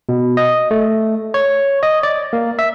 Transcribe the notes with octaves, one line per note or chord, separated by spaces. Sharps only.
B2
D#5
A3
C#5
D#5
D5
A#3
E5